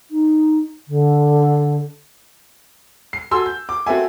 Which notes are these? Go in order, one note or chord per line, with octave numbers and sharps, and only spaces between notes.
D#4
D3
C7
F#4 A4 G#5 C6 E6
G6
D6
C4 F#4 A4 E5 G#5